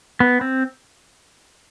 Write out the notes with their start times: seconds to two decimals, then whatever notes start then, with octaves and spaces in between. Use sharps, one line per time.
0.20 B3
0.41 C4